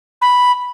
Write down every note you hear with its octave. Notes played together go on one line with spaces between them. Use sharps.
B5